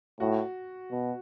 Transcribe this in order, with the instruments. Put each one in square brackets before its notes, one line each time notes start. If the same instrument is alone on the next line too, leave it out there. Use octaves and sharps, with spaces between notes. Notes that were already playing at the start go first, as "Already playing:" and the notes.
[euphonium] A2 [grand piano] F#4
[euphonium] B2